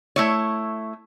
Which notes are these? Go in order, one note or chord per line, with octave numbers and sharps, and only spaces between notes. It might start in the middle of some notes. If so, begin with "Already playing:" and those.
A3 E4 C#5